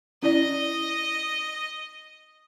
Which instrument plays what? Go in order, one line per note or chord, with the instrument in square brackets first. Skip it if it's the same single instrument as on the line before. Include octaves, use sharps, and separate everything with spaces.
[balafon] C#4 E4 D5 [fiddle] D#5